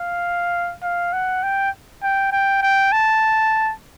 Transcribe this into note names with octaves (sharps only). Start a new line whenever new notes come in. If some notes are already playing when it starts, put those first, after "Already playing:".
Already playing: F5
F5
F#5
G5
G5
G5
G5
A5